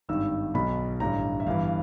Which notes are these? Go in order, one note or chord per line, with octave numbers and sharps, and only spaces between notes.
G#1 G2 D#3 E6
B1 B2 B5
A1 G2 D3 A#5
E5
G1 G2 E3 F5
F5